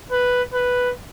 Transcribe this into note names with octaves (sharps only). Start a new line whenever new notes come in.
B4
B4